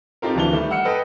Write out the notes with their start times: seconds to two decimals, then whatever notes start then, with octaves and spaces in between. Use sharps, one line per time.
0.22 C4 D#4 F4 G4 A4 A#4
0.35 D1 E3 D4 A5 F7 G7
0.52 D#3 G3 A3
0.71 F#5 E6 F6 C#7
0.85 A4 B4 D#5 G5 D#6